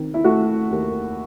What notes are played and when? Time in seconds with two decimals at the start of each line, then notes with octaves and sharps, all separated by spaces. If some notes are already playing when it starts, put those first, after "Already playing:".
Already playing: D#3 C4
0.14 E4
0.24 A3 F#4
0.71 D#2